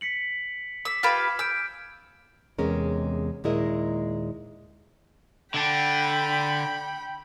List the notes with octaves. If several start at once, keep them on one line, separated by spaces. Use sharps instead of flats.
B6 C#7 F#7
D6 E6 B6
F4 G4 B4 F6 G#6 E7
G#5 E6 G6 D7
E2 C3 G#3 C#4 A#4
D#2 A#2 G#3 E4 A#4 D#5
D3 D4 G5 B5